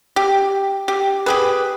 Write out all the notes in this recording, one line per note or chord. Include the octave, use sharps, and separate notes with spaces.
G4
G4
G4 G#4 B4